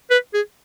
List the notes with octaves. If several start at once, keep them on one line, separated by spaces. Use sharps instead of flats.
B4
G#4